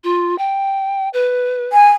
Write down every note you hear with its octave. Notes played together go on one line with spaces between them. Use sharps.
F4
G5
B4
G#5